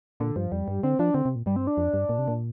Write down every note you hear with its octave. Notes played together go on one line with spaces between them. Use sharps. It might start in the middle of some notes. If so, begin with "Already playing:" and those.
A#2 D3
G2 F3
F2 G3
G2
D3 C4
F3 D4
D3 C4
C3
A#2
G2 G3
C4
D4
F2
G2
A#2
C3
A#2